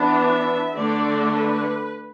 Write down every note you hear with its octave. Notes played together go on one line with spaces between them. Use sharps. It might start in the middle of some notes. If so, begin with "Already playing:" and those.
Already playing: E3 B3 D4
E5
D3 A3 D4 D5
B4